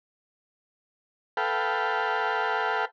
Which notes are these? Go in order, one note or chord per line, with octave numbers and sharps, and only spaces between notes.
A4 B4 F5 G5